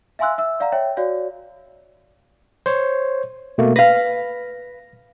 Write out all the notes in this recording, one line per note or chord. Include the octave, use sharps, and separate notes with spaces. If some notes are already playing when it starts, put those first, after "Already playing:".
E5 F5 G#5 C6 E6 F#6
E5 E6
D5 F5 F#5 A#5
C#5 E5 G5
F#4 C#5 D5 F5
C5 C#5
B2 A3 A#3
B4 F5 A#6